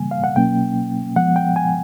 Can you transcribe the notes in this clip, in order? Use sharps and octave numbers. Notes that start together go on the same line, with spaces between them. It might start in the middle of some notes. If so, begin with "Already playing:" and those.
Already playing: C#3 E3 G3 A#3 G#5
F5
F#5
B2 F#3 A#3 C#4 G5
F3 G#3 B3 F#5
G5
G#5